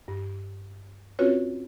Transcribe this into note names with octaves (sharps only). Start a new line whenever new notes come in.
G2
C4 C#4 F4 F#4 B4 C#5